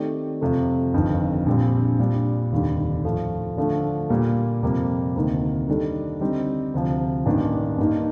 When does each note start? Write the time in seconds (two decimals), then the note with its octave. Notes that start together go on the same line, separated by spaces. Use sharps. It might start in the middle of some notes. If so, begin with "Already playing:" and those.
Already playing: D#3 A3 C4 G4 D5
0.41 F2 C3 F3 A3
0.93 G1 F2 D#3
1.46 A#1 A#2 G3 C4
1.99 A#2 G3 D4
2.52 F1 D#2 D3 G3 D4
3.05 A2 F3 A3
3.57 D3 F3 A3 D4
4.10 A#2 G3 A#3
4.63 F2 C3 G3 A#3
5.15 D2 C3 D#3 A#3
5.68 D#3 G3 D4 A4
6.20 D3 G3 C4 D#4
6.74 D2 C3 F3
7.26 A1 G2 D#3 A#3 D4
7.78 G2 D#3 A#3 D#4